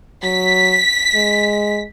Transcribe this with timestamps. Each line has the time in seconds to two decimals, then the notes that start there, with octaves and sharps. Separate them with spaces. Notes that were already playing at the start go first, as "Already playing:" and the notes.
0.23 F#3 B6
1.15 G#3